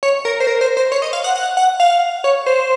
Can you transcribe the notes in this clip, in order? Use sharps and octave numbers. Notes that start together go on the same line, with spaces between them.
C#5
A#4
C5
A#4
C5
C5
C#5
D#5
F5
F#5
F#5
F#5
F5
C#5
C5